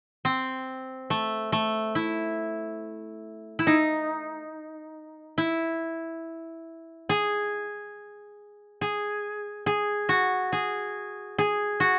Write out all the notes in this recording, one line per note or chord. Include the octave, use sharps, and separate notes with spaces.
C4
A3
A3
E4
E4
D#4
E4
G#4
G#4
G#4
F#4
G#4
G#4
F#4